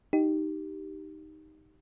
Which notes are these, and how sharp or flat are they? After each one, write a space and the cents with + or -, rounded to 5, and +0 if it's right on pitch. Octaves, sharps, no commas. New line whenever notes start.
D#4 +0 G4 -5